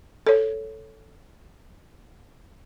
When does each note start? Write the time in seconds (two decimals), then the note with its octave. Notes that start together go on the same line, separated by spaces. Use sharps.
0.27 A4 C#5